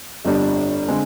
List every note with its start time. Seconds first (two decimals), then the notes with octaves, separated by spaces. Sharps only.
0.25 G1 F2 D3 G3 D4
0.88 D3 G#3 C4